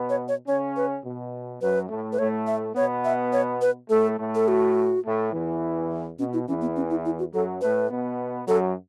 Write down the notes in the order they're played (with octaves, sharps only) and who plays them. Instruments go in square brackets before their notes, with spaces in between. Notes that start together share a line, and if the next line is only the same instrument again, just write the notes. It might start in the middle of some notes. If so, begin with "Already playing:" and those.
Already playing: [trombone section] B2 B3
[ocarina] C#5
C#5
[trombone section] C#3 C#4 [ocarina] C#5
[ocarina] B4
[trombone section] B2
[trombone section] F#2 F#3 [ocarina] B4
[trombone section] A2 A3
[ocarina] B4
[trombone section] A2 A3 [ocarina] C#5
[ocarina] E5
[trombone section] B2 B3 [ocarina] C#5
[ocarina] E5
C#5
B4
[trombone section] A2 A3 [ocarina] A4
[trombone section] A2 A3
[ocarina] A4
F#4
[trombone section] A2 A3
E2 E3
[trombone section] B2 [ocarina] C#4
[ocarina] E4
[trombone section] E2 E3 [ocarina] C#4
[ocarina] B3
C#4
E4
E4
F#4
[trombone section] F#2 F#3 [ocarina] A4
[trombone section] A2 A3 [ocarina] B4
[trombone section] B2 B3
[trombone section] F#2 F#3 [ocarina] A4